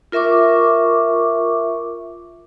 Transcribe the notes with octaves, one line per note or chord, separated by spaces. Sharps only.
F4 A#4 E5 C#6 D6